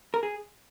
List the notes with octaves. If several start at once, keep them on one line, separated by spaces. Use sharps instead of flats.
A#4
G#4